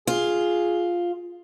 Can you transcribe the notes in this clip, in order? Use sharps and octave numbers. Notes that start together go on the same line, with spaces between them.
F4 G#4